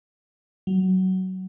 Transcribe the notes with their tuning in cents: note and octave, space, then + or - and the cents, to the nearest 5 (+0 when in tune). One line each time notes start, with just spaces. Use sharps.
F#3 +15